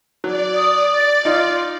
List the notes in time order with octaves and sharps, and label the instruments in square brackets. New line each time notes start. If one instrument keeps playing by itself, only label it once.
[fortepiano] F#3 [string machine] D5
[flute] D#6
A6
[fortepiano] D#4 [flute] F4